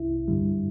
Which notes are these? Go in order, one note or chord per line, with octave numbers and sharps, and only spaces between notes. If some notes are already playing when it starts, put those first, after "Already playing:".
Already playing: C2 C3 E4
G2 D3 G3